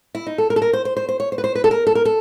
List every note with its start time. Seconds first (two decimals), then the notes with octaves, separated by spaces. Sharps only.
0.15 E4
0.26 D#4
0.38 A4
0.50 A#4
0.56 A4
0.62 A#4
0.73 C5
0.85 C5
0.97 C5
1.09 C5
1.20 C#5
1.32 C5
1.38 B4
1.44 C5
1.55 B4
1.64 A4
1.71 A#4
1.87 A4
1.95 A#4
2.05 A4